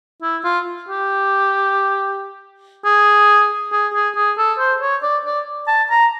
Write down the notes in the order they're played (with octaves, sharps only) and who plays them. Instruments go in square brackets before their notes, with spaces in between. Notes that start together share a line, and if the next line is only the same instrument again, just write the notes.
[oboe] E4
F4
G4
G#4
G#4
G#4
G#4
A4
C5
C#5
D5
D5
A5
A#5